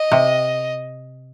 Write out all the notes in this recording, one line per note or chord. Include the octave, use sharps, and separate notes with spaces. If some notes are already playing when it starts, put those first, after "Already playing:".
Already playing: D#5
C3